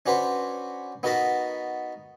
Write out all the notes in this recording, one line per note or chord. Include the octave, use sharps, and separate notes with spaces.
C#4 D4 F#4 B4 C5
B3 D#4 F#4 A#4 A5 B5